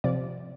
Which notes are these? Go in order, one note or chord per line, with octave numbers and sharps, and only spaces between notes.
C3 F3 D5